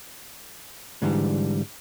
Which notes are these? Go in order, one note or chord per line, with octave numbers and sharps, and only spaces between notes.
G#2 D3 E3 G3